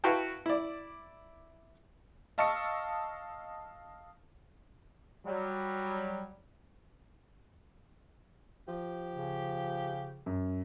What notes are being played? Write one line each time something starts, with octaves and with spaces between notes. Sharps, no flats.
E4 F#4 B4 F5 G5 A5
E4 D5
D#5 F5 A5 C#6 E6 C#7
F#3 G3
F3 G4
C#3
F#2